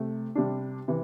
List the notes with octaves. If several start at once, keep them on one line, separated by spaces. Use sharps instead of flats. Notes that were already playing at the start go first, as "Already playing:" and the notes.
Already playing: C3 A3
C3 G3 D4
C3 E3